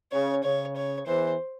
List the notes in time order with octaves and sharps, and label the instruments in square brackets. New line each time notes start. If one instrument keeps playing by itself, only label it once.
[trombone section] C#3 [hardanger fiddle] C#5
[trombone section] C#3 [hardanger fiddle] C#5
[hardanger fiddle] C#5
[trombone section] E2 E3 [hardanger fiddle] C5